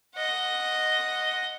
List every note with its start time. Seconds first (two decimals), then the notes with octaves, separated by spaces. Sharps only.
0.16 D#5 F#5